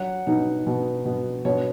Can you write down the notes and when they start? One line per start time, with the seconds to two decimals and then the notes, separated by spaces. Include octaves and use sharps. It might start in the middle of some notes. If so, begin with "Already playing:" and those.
Already playing: F#3 F#5
0.27 B2 D#4
0.67 B2
1.05 B2
1.45 B2 C#5